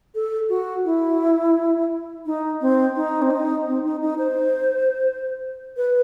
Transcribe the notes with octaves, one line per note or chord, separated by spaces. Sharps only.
A4
F#4
E4
D#4
C4
D#4
C4
D#4
C4
D#4
D#4
C5
B4